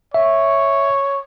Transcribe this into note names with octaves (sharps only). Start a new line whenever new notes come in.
C#5 E5